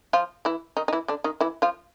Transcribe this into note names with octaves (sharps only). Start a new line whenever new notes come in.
F3 F4
E3 E4
D#3 D#4
D#4
E3 E4
D3 D4
D#3 D#4
E3 E4
F3 F4